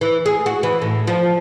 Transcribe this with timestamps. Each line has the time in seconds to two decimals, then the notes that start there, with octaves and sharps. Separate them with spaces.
0.01 E3
0.26 G#4
0.46 F#4
0.63 E3
0.82 A2
1.07 F3